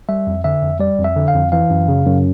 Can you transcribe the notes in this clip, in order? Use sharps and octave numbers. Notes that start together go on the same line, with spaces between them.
G3 E5
F2
D3 E5
F2
G3 D5
F2
E5
D3
F5
F2
E3 F5
F#2
C#3
F#2